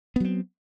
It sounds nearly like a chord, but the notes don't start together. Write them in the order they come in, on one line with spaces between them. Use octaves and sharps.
B3 F#3 C4